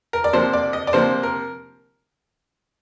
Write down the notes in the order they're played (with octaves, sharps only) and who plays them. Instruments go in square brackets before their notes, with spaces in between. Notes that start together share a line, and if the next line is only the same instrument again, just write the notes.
[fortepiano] A#4
D5
C3 F3 A#3 C5
D5
D#5
D5
C3 F3 A#3 C5
A#4